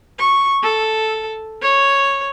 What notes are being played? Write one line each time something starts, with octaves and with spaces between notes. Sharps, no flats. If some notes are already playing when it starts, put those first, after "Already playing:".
C#6
A4
C#5